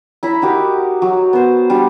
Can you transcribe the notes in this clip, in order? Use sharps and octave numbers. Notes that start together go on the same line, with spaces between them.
E4 A#5 B5
D#4 F#4 G4 A#4
F#3
B3 C5
G3 D4